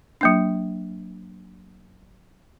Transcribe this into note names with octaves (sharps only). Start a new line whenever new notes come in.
F#3 A#3 D4